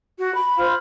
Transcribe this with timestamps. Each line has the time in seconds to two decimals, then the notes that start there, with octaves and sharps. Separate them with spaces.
0.19 F#4
0.34 B5
0.57 F4 C5 F5